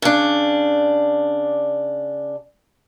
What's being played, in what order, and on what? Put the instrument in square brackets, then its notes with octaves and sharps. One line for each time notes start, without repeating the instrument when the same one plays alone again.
[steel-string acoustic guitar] C#3 D4